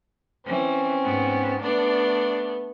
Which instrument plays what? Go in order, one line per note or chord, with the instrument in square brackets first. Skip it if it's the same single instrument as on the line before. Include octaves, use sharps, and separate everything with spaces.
[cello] E3 [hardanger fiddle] C4 C#4
[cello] G#2 B3
[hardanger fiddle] A3 B3 [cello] D4 D5